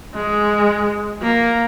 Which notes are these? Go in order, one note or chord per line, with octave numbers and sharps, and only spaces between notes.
G#3
A#3